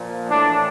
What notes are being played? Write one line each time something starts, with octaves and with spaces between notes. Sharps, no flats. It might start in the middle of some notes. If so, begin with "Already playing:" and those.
Already playing: A#2 F3
A2 E3 D4